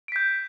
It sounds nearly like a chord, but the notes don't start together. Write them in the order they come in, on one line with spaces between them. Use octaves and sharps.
D7 B6 G6